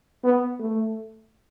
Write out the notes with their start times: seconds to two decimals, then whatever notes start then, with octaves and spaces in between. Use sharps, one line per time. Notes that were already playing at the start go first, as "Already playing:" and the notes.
0.24 B3
0.59 A3